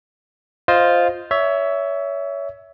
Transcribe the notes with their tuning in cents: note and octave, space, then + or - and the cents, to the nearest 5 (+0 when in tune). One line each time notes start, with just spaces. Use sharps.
F4 +0 C5 +0 D#5 +0
C#5 +25 E5 +0